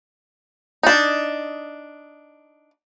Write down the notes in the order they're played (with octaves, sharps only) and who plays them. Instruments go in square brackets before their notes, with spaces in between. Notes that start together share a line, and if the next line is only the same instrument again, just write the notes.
[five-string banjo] D4 D#4